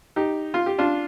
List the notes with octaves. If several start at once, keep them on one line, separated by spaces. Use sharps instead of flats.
D#4 G4
F4
G4
D4 F4